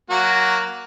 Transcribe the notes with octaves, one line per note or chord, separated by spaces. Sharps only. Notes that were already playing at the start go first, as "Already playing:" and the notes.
F#3 A#3 F#4